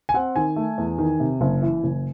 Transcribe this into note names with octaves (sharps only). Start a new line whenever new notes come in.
G#5
C4 F#5
D#3 G#5
A3
E2
D#3
C3
F#1
E3
F#1